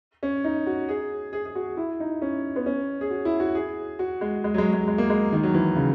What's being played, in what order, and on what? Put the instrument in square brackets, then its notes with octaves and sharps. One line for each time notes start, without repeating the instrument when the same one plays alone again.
[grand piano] C#4
D#4
F#4
G#4
G#4
G#4
F#4
E4
D#4
C#4
B3
C#4
G#4
F#4
E4
F#4
G#4
F#4
G#3
G#3
F#3
G#3
G#3
G#3
A#3
G#3
D#3
F#3
E3
C#3